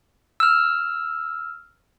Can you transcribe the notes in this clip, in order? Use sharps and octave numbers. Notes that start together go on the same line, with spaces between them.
E6 F6